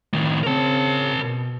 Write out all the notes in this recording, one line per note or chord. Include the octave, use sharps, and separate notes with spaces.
A2 D#3
C#3 C4 A#4 A5
B2